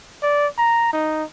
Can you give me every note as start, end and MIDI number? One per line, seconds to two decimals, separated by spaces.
0.23 0.47 74
0.58 0.90 82
0.93 1.24 63